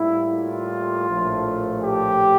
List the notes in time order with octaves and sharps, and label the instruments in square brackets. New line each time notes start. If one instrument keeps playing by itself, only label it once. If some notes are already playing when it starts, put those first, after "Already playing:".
Already playing: [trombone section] A2 G3 A#3 E4
F4
A#1 A2 F3 A3
G4